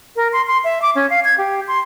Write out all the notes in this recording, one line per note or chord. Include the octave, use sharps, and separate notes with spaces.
A#4
C6
C6
E5
D6
C#4
F5
G#6
G4
C6